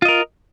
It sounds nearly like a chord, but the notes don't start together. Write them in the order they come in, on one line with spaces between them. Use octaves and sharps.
F4 D#5 A#4